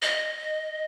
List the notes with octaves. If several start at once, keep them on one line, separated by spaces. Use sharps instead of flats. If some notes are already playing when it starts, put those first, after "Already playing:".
D#5